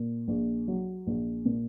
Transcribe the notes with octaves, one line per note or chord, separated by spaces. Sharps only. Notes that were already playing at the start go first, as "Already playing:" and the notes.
Already playing: A#2
A#1
F#3
A#1
A#2